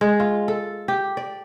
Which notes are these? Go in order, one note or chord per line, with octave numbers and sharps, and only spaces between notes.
G#3
F4
A4
G4
D5